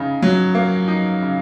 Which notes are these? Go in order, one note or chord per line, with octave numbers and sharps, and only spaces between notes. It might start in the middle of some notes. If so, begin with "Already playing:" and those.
Already playing: C#3 D#4
F#3
A#3
D#4
C#3